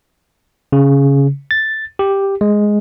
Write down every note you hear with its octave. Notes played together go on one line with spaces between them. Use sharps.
C#3
A6
G4
G#3